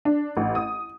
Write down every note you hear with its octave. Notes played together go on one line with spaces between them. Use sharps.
D4
A1
D#6